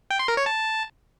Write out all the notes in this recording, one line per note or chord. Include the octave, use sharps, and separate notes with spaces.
G5
C6
A#4
C#5
A5